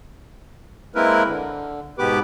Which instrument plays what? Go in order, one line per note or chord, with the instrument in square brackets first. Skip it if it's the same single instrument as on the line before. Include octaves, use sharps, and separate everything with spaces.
[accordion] G#3 A#3 C4 E4 A#4 B4
D3
G#2 B2 B3 G4 B4 D6